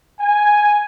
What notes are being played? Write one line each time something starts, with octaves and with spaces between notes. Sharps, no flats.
G#5